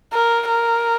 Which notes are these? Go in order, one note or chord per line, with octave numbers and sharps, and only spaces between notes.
A#4
A#4